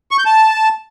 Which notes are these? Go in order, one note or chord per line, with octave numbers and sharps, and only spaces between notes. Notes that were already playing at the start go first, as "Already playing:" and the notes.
C#6
G6
A5